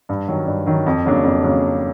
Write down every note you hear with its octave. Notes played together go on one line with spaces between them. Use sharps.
G2
D#3 F#3
G2
D#3 F#3
F2
C#3 F#3 A#3 D4
F2
C#3 F#3 A#3 D4